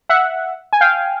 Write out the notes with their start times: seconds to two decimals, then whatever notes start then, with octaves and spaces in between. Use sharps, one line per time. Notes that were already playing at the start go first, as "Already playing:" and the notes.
0.09 E5 F#5
0.73 G#5
0.81 F5 G5